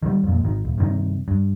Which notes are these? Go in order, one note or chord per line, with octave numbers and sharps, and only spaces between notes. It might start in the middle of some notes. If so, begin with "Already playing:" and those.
D#3 E3 G3
F2 A#2
G#1 D#3
D#1
G2 C3 D#3
G2